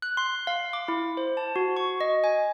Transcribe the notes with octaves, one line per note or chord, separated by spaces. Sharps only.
F#6
C6
F5
D6
E4
C5
A5
F#4
C#6
D#5
G#5